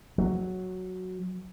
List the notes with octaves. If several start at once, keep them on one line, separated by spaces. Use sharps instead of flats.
F#3